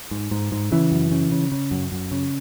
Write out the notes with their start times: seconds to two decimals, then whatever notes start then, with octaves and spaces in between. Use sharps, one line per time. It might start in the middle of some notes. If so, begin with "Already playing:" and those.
0.11 G#2
0.31 G#2
0.52 G#2
0.72 C#3 E3
0.91 F#2
1.11 C#3
1.31 C#3
1.52 C#3
1.71 F#2
1.92 F#2
2.11 C#3